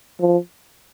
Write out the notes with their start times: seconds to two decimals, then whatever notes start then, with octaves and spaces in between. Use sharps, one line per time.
0.20 F3